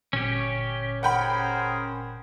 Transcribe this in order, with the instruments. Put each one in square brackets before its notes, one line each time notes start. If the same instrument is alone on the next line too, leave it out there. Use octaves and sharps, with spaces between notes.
[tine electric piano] G1 A#2 [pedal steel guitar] C#4 G4
[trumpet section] G#4 A#4 C5 [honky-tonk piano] F#5 G5 B5